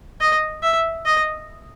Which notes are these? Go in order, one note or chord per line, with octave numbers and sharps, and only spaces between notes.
D#5
E5
D#5